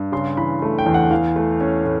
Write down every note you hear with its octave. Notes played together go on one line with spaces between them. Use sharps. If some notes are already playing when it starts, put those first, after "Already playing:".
Already playing: G2
C#3 C6
E3 B5
A3
G5
E2
F#5
E3 F5
A3
C#4
A2